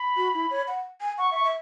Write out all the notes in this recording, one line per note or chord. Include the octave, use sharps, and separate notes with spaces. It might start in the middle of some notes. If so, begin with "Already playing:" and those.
Already playing: B5
F#4
E4
C#5
F#5
G#5
F#5 C#6
E5
C#6
E5